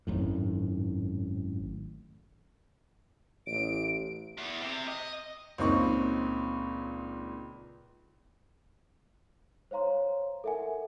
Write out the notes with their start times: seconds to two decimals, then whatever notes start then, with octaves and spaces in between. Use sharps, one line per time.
0.07 G#1 F#2 A2
3.47 A1 D7
4.38 E2
4.61 C3
4.87 D#5
5.58 C#2 A#2 C4 D#4 C#6
9.71 C5 C#5 F5 A#5 C6
10.44 A4 A#4 E5 F#5 G#5